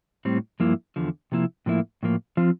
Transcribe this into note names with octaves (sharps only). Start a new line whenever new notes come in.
A2 G3 C4
G2 F3 A#3 E4
E2 D3 F3
C3 F3 A#3 E4
A2 F3 A#3 E4
A2 F3 A#3
F3 C4 F4